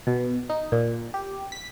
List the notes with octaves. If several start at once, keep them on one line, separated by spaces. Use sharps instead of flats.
B2
D#4
A#2
G4
B6